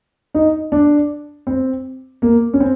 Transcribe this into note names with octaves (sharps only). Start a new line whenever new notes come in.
D#4
D4
C4
A#3
C#4
C4